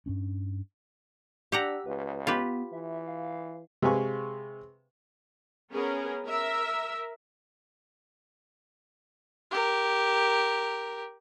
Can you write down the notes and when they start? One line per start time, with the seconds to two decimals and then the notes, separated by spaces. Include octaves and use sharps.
0.06 G2 C#4 D4
1.52 D4 G4 F#5 A#5 E6
1.86 C#2 B4
2.27 B3 F4 G4 B4
2.73 E3 E5
3.07 F5
3.82 C3 G#3 B4 F5 G#5 C#6
5.72 B3 C#4 G#4 A#4
6.27 A#4 E5
9.51 G4 A#4